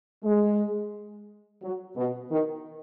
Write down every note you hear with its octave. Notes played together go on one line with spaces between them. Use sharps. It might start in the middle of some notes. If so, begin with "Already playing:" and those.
G#3
F#3
B2
D#3